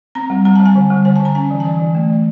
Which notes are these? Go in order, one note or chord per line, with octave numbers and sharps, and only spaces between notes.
C4 A#5
G3
G3 A#5
A5
G3
G#5
D3
G3
D3 G#5
A5
D3
A#5
C#4 G#5
E3
A5
E3 G#5
E3
A3
E3